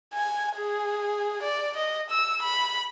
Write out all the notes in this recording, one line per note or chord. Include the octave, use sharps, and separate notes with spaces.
G#5
G#4
D5
D#5
E6
B5